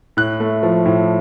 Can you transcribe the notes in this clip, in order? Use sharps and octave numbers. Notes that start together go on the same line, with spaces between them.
A2 F#6
A3
F3
A2